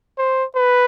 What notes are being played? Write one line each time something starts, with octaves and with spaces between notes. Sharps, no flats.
C5
B4